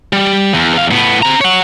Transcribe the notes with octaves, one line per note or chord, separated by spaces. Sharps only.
G3
E2
E2 F5
A2 B3
C4 A#5
C#5 F#5